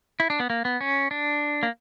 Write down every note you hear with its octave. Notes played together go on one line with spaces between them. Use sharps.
E4
D4
B3
A#3
B3
C#4
D4
A#3